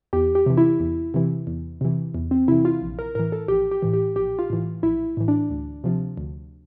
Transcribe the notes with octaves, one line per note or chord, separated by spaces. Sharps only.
E2 G4
G4
C3 E3
E4
E2
C3 E3
E2
C3 E3
E2
C4
C3 E3 E4
F4
A#1
A#4
A2 E3 A#4
A4
A#1 G4
G4
A2 E3
G4
A#1 G4
F4
A2 E3
A#1 E4
A2 E3
D4
D2
C3 F3
D2